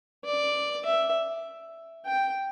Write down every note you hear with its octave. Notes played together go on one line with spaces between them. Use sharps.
D5
E5
G5